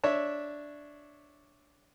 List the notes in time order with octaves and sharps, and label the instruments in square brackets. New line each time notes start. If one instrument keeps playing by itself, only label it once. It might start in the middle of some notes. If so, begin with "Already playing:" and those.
[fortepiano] D4 C#5 E5